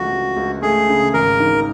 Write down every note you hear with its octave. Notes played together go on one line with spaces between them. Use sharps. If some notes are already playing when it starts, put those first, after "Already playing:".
Already playing: C#2 F3 A3 F#4
C#2
C#2
A3 G#4
C#3
G#1 A#4
D#3